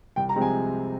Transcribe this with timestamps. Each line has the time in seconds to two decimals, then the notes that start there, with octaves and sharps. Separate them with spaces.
0.16 C2 G5
0.29 A#5
0.35 C3 F3 G#3 C4
0.42 G#5